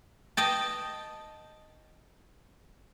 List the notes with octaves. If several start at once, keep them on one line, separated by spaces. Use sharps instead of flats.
D#5 G5 A5